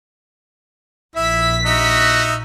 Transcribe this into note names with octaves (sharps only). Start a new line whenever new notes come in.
A#1 E4 E5 B6
D#4 F#4 E5